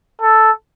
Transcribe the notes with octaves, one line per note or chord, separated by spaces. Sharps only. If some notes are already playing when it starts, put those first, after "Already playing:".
A4